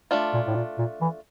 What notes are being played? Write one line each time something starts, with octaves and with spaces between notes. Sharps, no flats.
A3 D4 F4
A#2
A2
A#2
A#2
E3